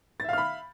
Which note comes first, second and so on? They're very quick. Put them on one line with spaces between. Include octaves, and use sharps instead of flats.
A6 E5 F5 F6 B5